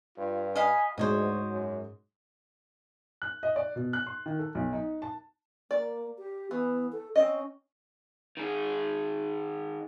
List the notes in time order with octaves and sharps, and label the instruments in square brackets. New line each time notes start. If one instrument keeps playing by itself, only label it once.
[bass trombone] G2 [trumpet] F4
[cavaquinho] D#5 F5 B5 [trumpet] G#5
[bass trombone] D2 [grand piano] G#2 G#3 [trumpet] F#4 [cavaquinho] C5 C#5 D#5
[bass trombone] F#2
[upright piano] F#6
D#5
D5
B2
F#6
C6
D#3
A4
B1
D#4
A5
[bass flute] A#3 [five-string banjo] D5
[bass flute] G4
[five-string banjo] E3 [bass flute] B3
[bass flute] A4
[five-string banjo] C4 D#5 [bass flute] C#4
[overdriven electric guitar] D#3 G#4